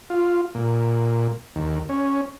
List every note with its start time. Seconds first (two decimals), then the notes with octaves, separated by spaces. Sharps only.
0.10 F4
0.55 A#2
1.56 D#2
1.89 C#4